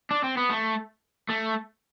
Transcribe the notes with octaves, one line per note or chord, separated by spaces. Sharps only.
D4
C4
B3
A3
A3